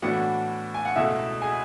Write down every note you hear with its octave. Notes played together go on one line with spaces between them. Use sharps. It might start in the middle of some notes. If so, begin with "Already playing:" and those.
A2 E3 B3 D4 F#4 F#5
G#5
F#5
C#2 B2 A3 E4 E5
G#4 G#5